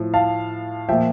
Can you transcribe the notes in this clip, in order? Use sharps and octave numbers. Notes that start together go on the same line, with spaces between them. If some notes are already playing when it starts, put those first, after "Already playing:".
Already playing: A2 F3
F5 A5
A#2 F3 E5 G5